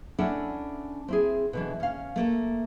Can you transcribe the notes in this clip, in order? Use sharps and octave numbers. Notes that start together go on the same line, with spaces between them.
C#4 D4 E4 A4 F#5
C4 E4 G#4
B2 D3 E3
C#4 F5
A3 A#3 A4